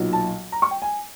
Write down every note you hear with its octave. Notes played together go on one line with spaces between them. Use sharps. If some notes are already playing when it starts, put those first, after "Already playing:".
Already playing: B1 A#2 F#3
A5
A#5
C#6
G5
G#5